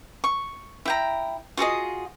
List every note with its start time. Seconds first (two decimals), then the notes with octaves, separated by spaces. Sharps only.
0.24 C#6
0.85 E4 G5 A#5
1.57 F4 F#4 G#4 D#5